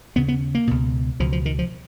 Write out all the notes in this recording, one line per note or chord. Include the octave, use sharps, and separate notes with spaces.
D#2 C#3 B3
B3
A#3
C#2 B2
C#2 B2 F3
F3
D#3
F3